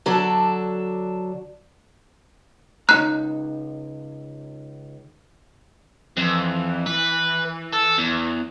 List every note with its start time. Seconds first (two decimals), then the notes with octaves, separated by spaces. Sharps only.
0.06 D3 F#3 D4 A4
2.89 C#2 D#4 A#5 F#6
6.17 F2 E3
6.86 B4
7.73 A4
7.98 E2